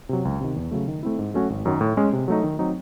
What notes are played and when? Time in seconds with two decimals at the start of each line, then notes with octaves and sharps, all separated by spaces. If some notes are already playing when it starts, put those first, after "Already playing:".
0.09 C3 F#3
0.25 C#2
0.41 C3 D#3
0.56 E2
0.71 C#3 F#3 A3
0.88 D#3
1.03 A3 C4 E4
1.19 G#2
1.34 F#3 A3 C#4 F#4
1.50 G#1
1.65 F#2 D#3 F#3
1.81 A2
1.97 G#3 C#4
2.13 C3
2.28 F#3 A3 D#4
2.44 D#3
2.59 F#3 C4 D#4